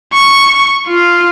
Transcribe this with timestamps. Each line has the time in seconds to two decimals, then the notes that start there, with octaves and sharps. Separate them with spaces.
0.13 C#6
0.87 F4